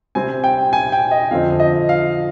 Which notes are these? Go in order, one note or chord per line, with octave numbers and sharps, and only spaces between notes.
C3 G3 C4 G#5
G5
G#5
G5
D#5
F2 D3 F3 C4 F5
D#5
F5